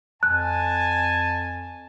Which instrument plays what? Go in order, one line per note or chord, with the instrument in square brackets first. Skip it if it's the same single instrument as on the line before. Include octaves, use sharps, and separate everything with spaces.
[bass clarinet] F2 [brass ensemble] G#5 [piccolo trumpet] A5 [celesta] F#6